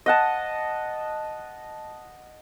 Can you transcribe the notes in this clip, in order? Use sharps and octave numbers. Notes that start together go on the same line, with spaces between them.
D#5 F#5 A5